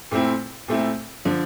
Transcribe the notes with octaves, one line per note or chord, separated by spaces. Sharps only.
A#2 A3 C4 E4
A#2 A3 C4 E4
D3 F3